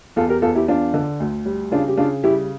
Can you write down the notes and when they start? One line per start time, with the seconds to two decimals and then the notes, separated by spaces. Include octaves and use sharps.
0.16 E2 F4 A4
0.29 G4 A#4
0.42 E2 F4 A4
0.55 E4 G4
0.68 E2 D4 F4
0.94 D3
1.20 D2
1.46 G3
1.71 C#3 D4 F4
1.88 G4
1.98 C#3 D4 F4
2.24 G3 E4 G4